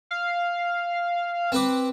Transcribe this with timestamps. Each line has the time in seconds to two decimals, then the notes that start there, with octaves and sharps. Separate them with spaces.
0.11 F5
1.52 C4 B4 D6